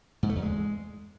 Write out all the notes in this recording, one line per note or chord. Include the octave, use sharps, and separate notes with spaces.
G#2
A3
E2
G#3